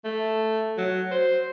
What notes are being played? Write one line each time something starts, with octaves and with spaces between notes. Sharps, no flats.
A3
F#3
C5